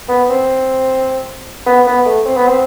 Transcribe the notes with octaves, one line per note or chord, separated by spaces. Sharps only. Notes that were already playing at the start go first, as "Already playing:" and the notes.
B3
C4
B3
B3
A3
C4
B3
C4